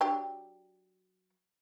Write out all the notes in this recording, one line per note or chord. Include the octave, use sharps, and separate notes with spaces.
F#3 D4 G4